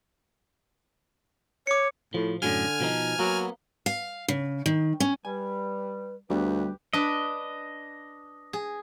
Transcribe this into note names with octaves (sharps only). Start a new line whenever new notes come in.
C#5 D6 C#7
A2 F3
F#2 A2 D3 F#3 G#5 F6
B2 F3 D#4
F#3 A#3 B3
F5
C#3
D#3
C#4
G3 B4 G#5
D2 G3 B3 D4 G4 B4
D4 B4 D#5
G#4